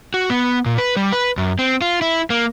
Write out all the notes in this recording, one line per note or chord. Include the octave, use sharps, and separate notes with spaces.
F#4
B3
A#2
B4
G3
B4
F#2
C4
F4
E4
A#3